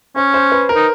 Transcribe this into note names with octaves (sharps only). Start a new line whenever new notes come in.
C#4 C5
C5
B4
A#4
D#4